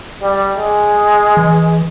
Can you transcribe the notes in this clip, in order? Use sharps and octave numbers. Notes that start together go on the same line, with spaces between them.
G3
G#3
E3